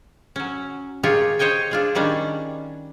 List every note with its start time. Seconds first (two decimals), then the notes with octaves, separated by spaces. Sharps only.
0.36 F#3 C#4
1.03 F4 G4 G#4 A#4 C5 C#5
1.39 C5 C#5 D#5 G5 G#5
1.71 D4 F4 G#4
1.95 D#3 G3 C#4 D4